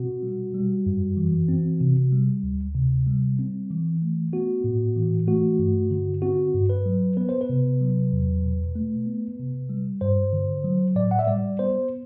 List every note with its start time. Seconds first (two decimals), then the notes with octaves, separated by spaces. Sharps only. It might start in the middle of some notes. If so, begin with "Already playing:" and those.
Already playing: B2 C4 F#4
0.23 G3
0.54 G3
0.86 F#2
1.17 E3
1.48 C4
1.81 C3
2.12 G3
2.43 D2
2.75 C3
3.07 G3
3.39 C4
3.71 E3
4.02 A3
4.33 B3 F#4
4.64 A2
4.96 E3
5.27 A3 F#4
5.59 G2
5.90 D3
6.22 C4 F#4
6.54 G2
6.69 B4
6.86 F#3
7.17 B3 B4
7.29 C5
7.41 B4
7.49 C3
7.81 F#3
8.12 E2
8.44 B2
8.75 A3
9.06 B3
9.39 C3
9.69 G3
10.01 G2 C5
10.33 D3
10.64 F#3
10.95 A2 D5
11.11 F#5
11.19 E5
11.27 G3 D5
11.59 B3 C5